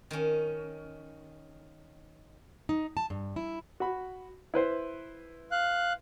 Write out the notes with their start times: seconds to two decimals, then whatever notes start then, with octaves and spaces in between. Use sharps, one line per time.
0.11 D#3 C#4
2.69 D#4
2.97 A5
3.10 G2
3.36 E4
3.80 F#4 B5
4.54 E4 B4 C5
5.51 F5 F#6